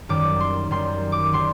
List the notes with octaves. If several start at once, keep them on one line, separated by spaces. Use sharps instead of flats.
F#2 D#3 G3 D6
C6
F#2 D#3 G3 C6
D6
D#3 G3 C6